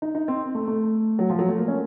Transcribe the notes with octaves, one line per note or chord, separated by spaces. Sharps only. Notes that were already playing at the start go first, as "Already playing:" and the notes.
D#4
D#4
C4
A3
A3
F#3
F3
F#3
A3
A#3
C#4